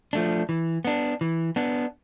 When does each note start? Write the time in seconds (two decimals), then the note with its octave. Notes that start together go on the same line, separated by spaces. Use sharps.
0.13 F3 A3 D4
0.49 E3
0.85 B3 D4
1.21 E3
1.56 B3 D4